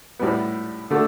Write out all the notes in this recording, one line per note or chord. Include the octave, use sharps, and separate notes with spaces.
A2 G3 B3
D3 A3